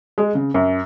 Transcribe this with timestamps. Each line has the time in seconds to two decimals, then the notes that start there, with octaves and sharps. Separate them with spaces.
0.18 G#3
0.35 C#3
0.54 F#2